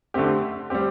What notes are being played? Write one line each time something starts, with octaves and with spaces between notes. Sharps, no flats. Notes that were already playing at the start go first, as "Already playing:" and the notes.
D3 A3 C4 G4
G3 C4 G4